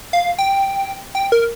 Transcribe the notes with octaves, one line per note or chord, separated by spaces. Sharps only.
F5
G5
G5
A#4